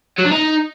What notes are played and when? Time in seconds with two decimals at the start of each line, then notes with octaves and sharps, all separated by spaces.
0.18 F#3
0.25 D4
0.31 D#4